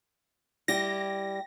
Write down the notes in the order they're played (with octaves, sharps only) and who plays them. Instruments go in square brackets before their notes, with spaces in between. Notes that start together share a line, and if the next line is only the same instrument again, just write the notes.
[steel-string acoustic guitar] G3 E4 G4 [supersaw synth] A#6